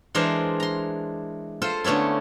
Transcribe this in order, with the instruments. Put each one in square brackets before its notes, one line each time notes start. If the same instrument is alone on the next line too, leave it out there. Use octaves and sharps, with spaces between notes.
[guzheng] E3 G#3 D4 A#4 C5
A#5 C6
F4 A4 C5
D3 A3 B3 C#4 E4